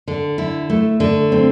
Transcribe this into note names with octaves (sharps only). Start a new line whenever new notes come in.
D3
E4
A3
D3
C4